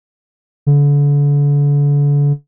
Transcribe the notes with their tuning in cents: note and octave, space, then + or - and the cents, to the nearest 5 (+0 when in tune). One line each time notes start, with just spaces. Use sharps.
D3 -35